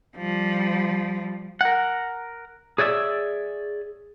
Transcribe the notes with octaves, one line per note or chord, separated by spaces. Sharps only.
F3 G3
A#4 F#5
G#4 C#5 D5 E5